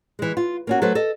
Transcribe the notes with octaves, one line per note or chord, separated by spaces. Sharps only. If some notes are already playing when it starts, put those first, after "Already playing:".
E3 G#3
F4
A#3 C#4 F#4
F#3 A3 A4 B4 C5
A4 D#5